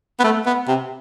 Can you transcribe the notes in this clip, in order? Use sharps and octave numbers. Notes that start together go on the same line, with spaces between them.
B3
A3
B3
C3